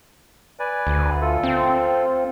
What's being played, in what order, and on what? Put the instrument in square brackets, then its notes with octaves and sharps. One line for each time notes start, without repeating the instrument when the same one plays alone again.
[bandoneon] B4 D5 G#5
[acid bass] D2
[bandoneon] F4 A4
[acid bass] C4